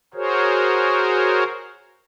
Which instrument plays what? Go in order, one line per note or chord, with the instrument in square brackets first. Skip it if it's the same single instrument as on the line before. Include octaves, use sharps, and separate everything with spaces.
[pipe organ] F#4 G#4 A#4 C5 C#5